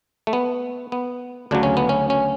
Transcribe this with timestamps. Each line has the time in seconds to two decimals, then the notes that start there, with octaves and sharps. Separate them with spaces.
0.27 A3
0.33 B3
0.92 B3
1.51 D2 C#3 F#3 D4
1.63 C#4
1.77 B3
1.89 C#4
2.10 C#4